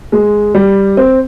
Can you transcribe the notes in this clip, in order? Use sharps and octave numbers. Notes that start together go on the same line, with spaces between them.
G#3
G3
C4